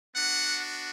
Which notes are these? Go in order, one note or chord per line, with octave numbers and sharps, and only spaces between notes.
B3 D4 F#4 F#5